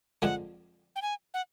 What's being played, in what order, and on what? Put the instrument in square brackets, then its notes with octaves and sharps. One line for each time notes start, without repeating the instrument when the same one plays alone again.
[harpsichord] F2 D3 F3 G#3 [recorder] F#5
[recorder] G5
G#5
F#5